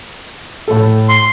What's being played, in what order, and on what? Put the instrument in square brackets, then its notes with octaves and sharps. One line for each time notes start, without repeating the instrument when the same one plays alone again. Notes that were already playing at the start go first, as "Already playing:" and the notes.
[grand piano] A2 A4
[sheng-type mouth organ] C6